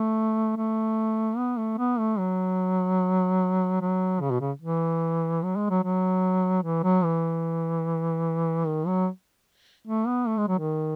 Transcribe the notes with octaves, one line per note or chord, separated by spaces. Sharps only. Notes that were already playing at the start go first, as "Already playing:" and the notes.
Already playing: A3
A3
B3
A3
B3
A3
F#3
F#3
C#3
B2
C#3
E3
F#3
G#3
F#3
F#3
E3
F#3
E3
D#3
F#3
A3
B3
A3
G#3
F#3
D#3